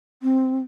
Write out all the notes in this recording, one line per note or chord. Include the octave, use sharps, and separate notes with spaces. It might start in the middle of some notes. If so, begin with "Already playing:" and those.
C4